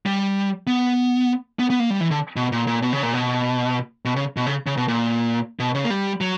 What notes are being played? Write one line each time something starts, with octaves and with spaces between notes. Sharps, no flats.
G3
B3
B3
B3
A#3
G3
E3
D3
B2
A#2
A#2
B2
C#3
A#2
B2
B2
C#3
B2
C#3
C#3
B2
A#2
B2
C#3
A#3
G3
F#3